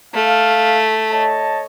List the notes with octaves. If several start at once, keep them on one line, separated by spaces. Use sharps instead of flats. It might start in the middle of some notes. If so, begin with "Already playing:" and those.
A3 F5
C#5 D#5 A5